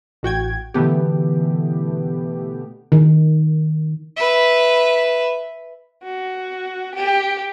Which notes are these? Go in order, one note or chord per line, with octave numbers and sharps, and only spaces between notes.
A1 F#4 G5 G#6
B2 D3 E3 A3 B3 G4
D#3
B4 E5
F#4
G4